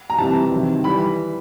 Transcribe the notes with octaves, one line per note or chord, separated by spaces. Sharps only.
A#5
C3 E3 G3 A5
C3 D#3 F#3
E3 G3 B5